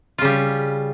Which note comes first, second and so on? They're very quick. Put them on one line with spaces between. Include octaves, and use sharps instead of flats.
F4 C#3 G3